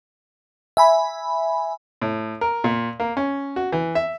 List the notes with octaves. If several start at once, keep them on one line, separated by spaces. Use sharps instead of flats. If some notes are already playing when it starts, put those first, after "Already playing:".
E5 G#5 B5
A2
A#4
A#2
A#3
C#4
F#4
E3
E5